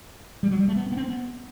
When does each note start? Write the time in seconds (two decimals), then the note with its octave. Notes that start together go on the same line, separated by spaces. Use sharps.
0.43 G3
0.51 F#3
0.59 G3
0.68 A3
0.76 B3
0.86 C4
0.92 B3
0.97 C4
1.08 B3